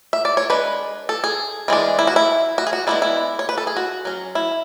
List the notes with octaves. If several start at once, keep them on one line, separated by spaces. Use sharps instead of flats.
E5
D5
C#5
G#3 D4 B4
A4
G#4
E3 G#3 D4
E4
F#4
E4
F#4
G#4
F#4
G#3 B3 D4 E4
E4
C#5
B4
A4
G#4
F#4
F#3 C#4
E4